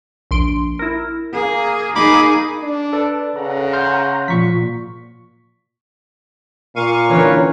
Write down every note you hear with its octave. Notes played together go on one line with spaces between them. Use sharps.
A#1 C6 D7
E4 A#4
A#3 G#4
D#4 G#4 B5 D6
D4
A4 B4 D5
C#3 F#5 A#5
C6 F6 G6
A#2 F3 C#6 B6
A#2 F5 C#6 D#7
D3 E3 C#4 A#4 B4 C#5